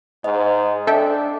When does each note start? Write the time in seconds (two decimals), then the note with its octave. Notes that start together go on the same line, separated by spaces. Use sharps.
0.24 G#2 C5 D#5
0.87 D4 A4 E5 G5